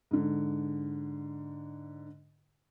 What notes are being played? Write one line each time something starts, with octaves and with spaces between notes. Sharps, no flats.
G#2 D3